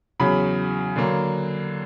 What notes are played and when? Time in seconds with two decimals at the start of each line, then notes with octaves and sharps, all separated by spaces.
0.20 E2 C#3 F#3 B5
0.96 D3 F#3 A#3